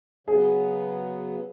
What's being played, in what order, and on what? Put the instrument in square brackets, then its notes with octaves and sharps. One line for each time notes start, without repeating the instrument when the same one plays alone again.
[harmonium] C#3 F#3 B3 [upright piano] G#4